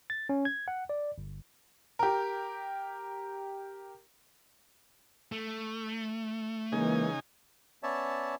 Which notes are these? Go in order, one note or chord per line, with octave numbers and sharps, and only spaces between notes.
A6
C#4
G#6
F#5
D5
G1
G4 A#4
A3
C#3 E3 G#3 A#3 D#4 G#5
B3 C#4 C#5 D5 E5 A5